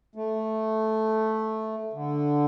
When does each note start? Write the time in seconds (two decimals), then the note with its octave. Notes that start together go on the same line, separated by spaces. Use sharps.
0.15 A3
1.93 D3